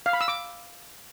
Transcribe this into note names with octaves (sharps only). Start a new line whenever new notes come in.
F5
B5
E6
D6